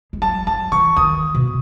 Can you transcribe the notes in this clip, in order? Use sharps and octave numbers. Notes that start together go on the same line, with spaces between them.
G#3
F#3 A5
F#3 A5
E3 C#6
D#3 D#6
B2